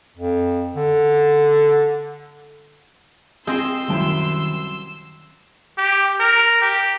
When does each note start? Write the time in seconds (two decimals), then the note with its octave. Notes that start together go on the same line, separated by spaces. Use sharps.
0.18 F2
0.76 D3
3.47 C4 G#4 C5 D#5 G5 C6 E6
3.88 C2 F#2 D#3 E4
5.78 G4
6.19 A#4
6.61 G4